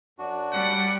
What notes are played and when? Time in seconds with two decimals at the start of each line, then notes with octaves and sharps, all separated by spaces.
0.19 F#2 D4 F#4
0.52 G3 F#5